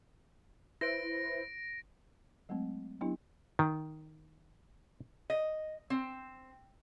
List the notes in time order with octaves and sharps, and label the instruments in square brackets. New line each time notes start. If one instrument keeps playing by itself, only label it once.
[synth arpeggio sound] E4 B4 C5 [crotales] A#6 D7
[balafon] F#3 G#3 A3 C4
F#3 B3 D4 E4 G4
[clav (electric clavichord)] D#3
[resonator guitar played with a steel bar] D#5
C4